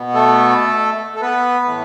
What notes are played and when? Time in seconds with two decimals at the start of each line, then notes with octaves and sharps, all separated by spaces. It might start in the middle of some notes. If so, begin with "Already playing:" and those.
Already playing: B2 B3
0.14 A3 A4
1.15 A4
1.22 B3 B4
1.65 A2 E3 A3